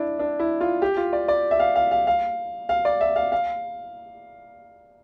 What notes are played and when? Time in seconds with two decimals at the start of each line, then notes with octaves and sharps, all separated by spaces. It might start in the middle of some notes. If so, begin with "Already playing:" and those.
Already playing: D4 E4
0.19 D4
0.39 E4
0.61 F4
0.82 G4
0.97 F4
1.13 D5
1.28 D5
1.51 E5
1.60 F5
1.76 F5
1.91 F5
2.07 F5
2.69 F5
2.85 D5
3.01 E5
3.16 F5
3.32 F5